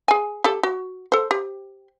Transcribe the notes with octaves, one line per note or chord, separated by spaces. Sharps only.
G#4 G#5
G4 A4
F#4
A4 C5
G4